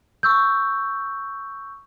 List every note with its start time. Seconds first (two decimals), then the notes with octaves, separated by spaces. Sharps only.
0.23 C#6 E6 G6